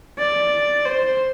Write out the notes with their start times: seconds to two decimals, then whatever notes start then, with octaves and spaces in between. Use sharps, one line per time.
0.18 D5
0.85 C5